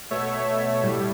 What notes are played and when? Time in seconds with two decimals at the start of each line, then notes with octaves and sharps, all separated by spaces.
0.10 B2 A3 C#5 E5
0.82 A2 G3